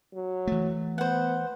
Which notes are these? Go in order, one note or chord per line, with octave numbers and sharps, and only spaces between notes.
F#3
E3 A3
B3 C5 F#5